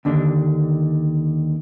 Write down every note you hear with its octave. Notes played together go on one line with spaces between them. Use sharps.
D#2 D3 D4